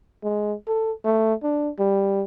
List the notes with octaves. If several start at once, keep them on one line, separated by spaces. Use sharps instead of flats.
G#3
A4
A3
D4
G3